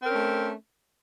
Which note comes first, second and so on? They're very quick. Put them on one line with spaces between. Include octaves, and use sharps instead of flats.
C4 A#4 C#4 A3